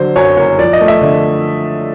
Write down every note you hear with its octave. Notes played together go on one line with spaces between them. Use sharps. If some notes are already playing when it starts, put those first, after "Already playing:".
Already playing: D3 F#3 C5
F#2 C#5
F#1 C#5
F3 D5
D#5
A3
E5
D3